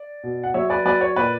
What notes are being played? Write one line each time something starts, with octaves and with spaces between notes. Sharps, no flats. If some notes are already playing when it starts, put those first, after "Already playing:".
Already playing: D5
B2
F#5
F#3 C#5 E5
B4 D5
F#3 B4 D5
C#5
A#2 B4 D5